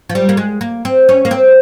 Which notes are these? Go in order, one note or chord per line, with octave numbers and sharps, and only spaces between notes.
F3
G3
A#3
G#3
A#3
C4
C#4
A#3
C4